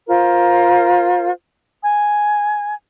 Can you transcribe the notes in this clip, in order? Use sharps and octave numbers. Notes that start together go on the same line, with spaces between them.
F4 A#4 C5
G#5